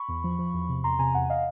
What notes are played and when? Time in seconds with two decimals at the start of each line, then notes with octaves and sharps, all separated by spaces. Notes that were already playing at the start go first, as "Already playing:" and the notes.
Already playing: B5 C#6
0.08 E2
0.24 F3
0.39 F3
0.54 E2
0.69 C3
0.84 E2 A#5 C6
0.99 C3 G#5 A#5
1.14 E2 F#5 G#5
1.29 D#5 F5